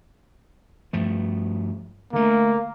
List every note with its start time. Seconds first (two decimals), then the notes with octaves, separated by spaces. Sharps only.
0.93 G2 F3 A3
2.13 D3 A3 A#3